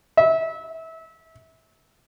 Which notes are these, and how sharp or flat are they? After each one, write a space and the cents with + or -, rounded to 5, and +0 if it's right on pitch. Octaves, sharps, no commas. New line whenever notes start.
E5 -25